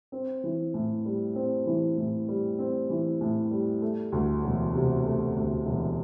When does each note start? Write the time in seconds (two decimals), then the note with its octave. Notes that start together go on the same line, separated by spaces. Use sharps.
0.12 C4
0.44 E3
0.74 A2
1.05 G3
1.35 C4
1.66 E3
1.97 A2
2.28 G3
2.59 C4
2.90 E3
3.21 A2
3.51 G3
3.82 A3
4.12 D2
4.44 E1
4.75 C3
5.05 A3
5.36 D2
5.66 E1